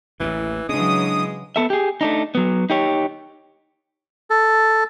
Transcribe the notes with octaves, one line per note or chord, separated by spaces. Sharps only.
A1 D#2 A2 E3
C#3 E3 F#3 G#3 C#4 D4 D#6
B3 A4 E5
G4 G#4
A3 D4 D#4
F#3 B3
D#4 G4 C#5
A4